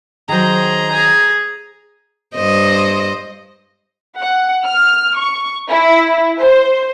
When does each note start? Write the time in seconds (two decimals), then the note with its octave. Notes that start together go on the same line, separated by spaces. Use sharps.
0.29 D#3 F#3 G#4 C5 A#5
0.92 G#4 G#5
2.36 G2 C5 D#5
4.21 F#5
4.65 F6
5.18 C#6
5.68 E4
6.41 C5